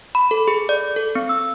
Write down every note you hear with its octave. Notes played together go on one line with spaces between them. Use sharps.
B5
A4
G#4
D5
A4
C4
E6